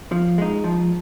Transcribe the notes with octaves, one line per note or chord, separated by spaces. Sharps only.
F3
G#3 D#4
F3